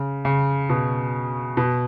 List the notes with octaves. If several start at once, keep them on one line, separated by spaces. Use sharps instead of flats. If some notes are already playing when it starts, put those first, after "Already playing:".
Already playing: C#3
C#3
B2
B2